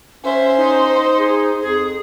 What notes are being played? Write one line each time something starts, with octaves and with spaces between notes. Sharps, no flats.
C#4 C5 E5
D#4
G#4
F2 G#4